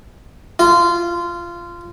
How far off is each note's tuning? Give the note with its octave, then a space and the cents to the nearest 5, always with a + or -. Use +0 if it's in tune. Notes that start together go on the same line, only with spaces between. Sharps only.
F4 -20